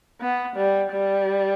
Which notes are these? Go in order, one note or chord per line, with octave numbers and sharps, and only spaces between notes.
B3
G3
G3